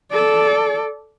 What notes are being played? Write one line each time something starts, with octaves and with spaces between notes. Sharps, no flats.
A4 D5